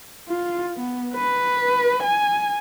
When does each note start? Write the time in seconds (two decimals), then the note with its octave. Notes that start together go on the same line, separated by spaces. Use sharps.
0.29 F4
0.77 B3
1.15 B4
2.04 G#5